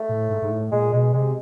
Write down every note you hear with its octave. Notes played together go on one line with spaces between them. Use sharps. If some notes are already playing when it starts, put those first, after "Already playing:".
Already playing: A3
A2
G#2
G#2
A2
A#2 G#3
B2 G#3
C3 G#3